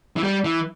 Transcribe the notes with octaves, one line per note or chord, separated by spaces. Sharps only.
E3
G3
E3